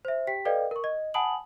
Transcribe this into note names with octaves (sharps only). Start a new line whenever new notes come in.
C5 E5
G4 G5 B6
A4 B4 D5 D#5 F5 G5
A#4 C#6
D#5
F#5 G#5 A5 B5 D#6 F#7